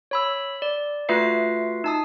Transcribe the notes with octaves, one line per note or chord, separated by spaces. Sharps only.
C#5 B5 E6
D5
A3 F4 F#4 B4 E5 C7
D#4 A5 D#6